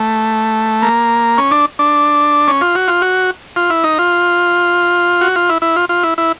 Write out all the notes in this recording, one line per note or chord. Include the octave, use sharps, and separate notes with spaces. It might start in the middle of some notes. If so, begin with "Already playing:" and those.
Already playing: A3
A#3
C#4
D4
D4
C#4
F4
F#4
F4
F#4
F4
E4
D#4
F4
F#4
F4
E4
E4
F4
F4
E4
E4